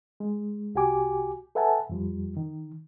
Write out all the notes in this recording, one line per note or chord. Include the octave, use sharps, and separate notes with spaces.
G#3
C2 F#4 G4 G#5 D6
A4 B4 E5 F#5 G#5 A5
F2 F3 G3
D#3